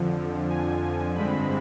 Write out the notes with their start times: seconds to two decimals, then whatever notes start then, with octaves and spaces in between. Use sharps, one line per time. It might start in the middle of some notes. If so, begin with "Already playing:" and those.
Already playing: F2 D3 F3
0.50 G#5
0.83 G#5
1.15 G2 D3 G#3 C4 B5